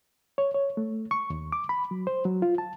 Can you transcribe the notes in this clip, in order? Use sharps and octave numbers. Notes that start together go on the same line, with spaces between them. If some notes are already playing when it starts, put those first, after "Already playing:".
C#5
C#5
A3
C#6
D#2
D6
B5
F#3
C5
F#3
F4
A5